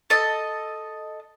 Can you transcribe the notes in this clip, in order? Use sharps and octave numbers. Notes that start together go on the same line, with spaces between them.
A4 D#5